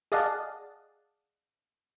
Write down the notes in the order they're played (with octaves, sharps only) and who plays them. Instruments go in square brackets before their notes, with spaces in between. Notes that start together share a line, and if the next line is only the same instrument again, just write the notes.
[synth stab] G#4 D5 D#5 F5 F#5 A5